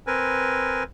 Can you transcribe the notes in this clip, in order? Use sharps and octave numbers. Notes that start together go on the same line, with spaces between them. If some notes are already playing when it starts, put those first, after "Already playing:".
C4 A#4 B4 G#5